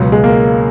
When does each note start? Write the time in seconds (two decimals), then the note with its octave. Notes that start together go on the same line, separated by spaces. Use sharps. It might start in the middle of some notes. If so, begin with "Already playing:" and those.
Already playing: C#2 B2 F#3
0.12 G#3
0.24 A#3